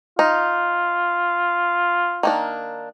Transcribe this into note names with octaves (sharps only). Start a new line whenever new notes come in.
D#4 F4
D#3 A#3 D4